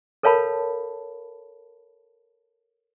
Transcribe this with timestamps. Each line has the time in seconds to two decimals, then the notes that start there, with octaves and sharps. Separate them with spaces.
0.23 A4 A#4 C#5 F5 A5 B5